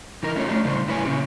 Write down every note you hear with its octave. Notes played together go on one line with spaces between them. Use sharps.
E3 D#4 A#4
A3 C#4 F4 C#5
A3 D4 G4
A2 C#3 G3 C5
G2 E4 B4 C#5 G#5
A#2 C#3 C#4 G4